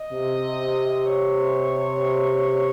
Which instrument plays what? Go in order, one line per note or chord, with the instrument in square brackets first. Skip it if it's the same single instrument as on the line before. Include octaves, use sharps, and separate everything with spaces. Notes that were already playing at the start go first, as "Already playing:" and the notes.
Already playing: [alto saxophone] D#5
[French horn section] C3
[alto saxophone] C#5